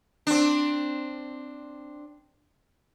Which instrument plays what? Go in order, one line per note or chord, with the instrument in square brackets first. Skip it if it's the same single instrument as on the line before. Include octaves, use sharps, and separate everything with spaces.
[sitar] C4 D4